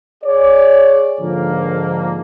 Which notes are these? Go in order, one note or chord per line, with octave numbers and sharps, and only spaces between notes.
G#4 C#5 D5
G#2 D3 F3 A#3